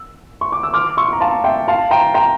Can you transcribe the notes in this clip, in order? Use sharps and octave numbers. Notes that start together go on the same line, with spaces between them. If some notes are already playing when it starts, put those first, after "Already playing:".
Already playing: E6
C#6
D6
E6
D6 F6
C#6 E6
A#5
F5 A5
E5 G5
F5 A5
G5 A#5
G5 A#5